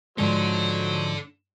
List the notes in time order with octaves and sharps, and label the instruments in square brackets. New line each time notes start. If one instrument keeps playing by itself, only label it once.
[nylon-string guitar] G#2 D3 F3 [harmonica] F#3 C5 [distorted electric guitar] D4 A4